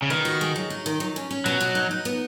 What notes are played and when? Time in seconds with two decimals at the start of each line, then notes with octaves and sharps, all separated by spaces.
0.02 C#3
0.10 D#3 B3
0.25 F#4
0.41 G#3
0.56 F#3
0.70 D#4
0.86 D#3
1.00 F#3
1.16 C#4
1.31 C#4
1.46 B2 F#3
1.61 B2
1.75 D#4
1.91 D#4
2.05 B3